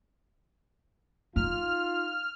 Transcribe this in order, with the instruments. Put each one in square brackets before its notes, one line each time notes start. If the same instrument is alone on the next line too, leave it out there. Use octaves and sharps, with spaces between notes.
[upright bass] D#4 [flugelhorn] F4 [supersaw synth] F6